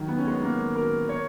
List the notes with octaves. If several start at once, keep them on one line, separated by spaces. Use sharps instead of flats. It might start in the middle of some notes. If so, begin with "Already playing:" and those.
Already playing: D#3 F#3
B3
C#4
G#3 B3
A#3 C#4
F#4 A#4
A#4 C#5